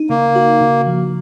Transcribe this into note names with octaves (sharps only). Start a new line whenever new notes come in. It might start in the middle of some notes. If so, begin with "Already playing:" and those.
Already playing: D#4
C#3 A#3
F#4
C#3
F3